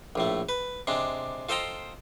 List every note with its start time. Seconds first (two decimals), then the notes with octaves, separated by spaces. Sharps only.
0.16 A#1 A2 A3
0.49 B4
0.87 C3 G#3 D4
1.49 F4 A4 C5 D#5 G5 A#5